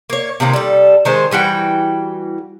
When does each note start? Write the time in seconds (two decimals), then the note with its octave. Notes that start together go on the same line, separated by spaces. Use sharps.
0.10 A#3 C#5
0.40 C3 D#3 A#3 C#4
0.53 G3 A4
1.05 D#3 G#3 C5
1.31 E3 G3 F#4 G5